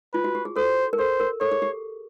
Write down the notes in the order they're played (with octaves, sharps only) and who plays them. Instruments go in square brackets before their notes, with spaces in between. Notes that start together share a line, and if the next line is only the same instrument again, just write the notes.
[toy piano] F4 [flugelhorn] B4
[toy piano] F#4
G4
G#4
[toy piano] A4 [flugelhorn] C5
[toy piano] A#4
[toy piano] A4 [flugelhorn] C5
[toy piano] A#4
[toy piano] A4 [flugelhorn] C#5
[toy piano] G#4
G4